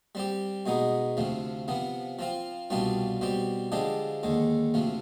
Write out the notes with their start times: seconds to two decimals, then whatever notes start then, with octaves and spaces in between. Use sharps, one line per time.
0.15 G3 C4 G4
0.66 B2 G#3 B3 D#4
1.17 D2 C3 F3
1.68 C3 F3 B3
2.19 F3 C4 F4
2.70 C2 B2 G3 D4 F4
3.21 B2 G3 C4 G4
3.72 D3 F3 G#3 D4 G4
4.23 D#2 D3 G#3
4.74 D2 C3 F3